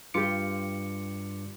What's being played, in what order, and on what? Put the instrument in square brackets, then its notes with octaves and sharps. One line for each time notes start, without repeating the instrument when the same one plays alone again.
[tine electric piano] G2 D6 C#7 [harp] F4 G4